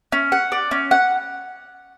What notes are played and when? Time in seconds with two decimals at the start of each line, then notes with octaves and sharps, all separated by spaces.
0.12 C#4
0.32 F#5
0.52 D5
0.71 C#4
0.91 F#5